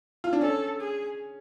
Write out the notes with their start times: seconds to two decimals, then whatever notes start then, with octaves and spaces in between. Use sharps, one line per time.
0.24 F4
0.33 D4
0.41 C#4 A4
0.80 G#4